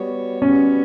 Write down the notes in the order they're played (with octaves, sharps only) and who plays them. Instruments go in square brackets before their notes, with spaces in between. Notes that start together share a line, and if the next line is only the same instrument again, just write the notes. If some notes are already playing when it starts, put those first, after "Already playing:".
Already playing: [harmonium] G3 B3 F#4 C#5
[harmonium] G3 B3 F#4 [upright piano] C#4